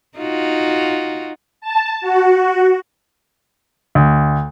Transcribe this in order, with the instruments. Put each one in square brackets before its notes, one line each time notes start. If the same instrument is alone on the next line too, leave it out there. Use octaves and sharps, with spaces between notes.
[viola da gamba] D#4 F4 F#4
[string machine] A5
F#4
[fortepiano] D2